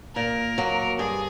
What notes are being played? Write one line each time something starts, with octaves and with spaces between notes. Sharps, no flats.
A#2 A#4
F#3 A#3
G2 G#4